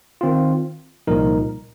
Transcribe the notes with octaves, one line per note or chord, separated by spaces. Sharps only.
D#3 C4 F4
C2 A#2 F3 D#4 A#4